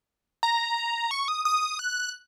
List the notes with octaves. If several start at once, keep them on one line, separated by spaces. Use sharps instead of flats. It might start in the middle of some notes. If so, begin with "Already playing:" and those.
A#5
C#6
D#6
D#6
F#6